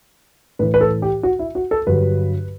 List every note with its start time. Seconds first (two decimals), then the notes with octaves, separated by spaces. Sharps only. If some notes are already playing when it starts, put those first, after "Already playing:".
0.59 A2 E3 B4
0.74 B4
0.81 A4
1.02 G4
1.23 F#4
1.39 E4
1.55 F#4
1.71 A4
1.87 G2 D3 F#3 B4